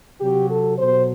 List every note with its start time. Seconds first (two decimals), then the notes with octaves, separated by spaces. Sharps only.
0.20 C3 F#3 G4
0.50 A4
0.78 B2 F#3 C5